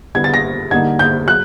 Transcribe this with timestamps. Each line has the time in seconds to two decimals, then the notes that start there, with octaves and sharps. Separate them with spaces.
0.15 D3 G3 B3 E4 G#6
0.24 A6
0.34 A#6
0.71 D3 G3 A#3 D#4 G#6
0.99 G6
1.27 F#3 F#6